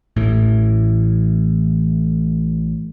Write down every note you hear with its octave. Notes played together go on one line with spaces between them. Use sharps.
A1 A2 E3